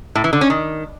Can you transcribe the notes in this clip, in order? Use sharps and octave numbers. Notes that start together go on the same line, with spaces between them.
A2
E3
D3
C#4
D#3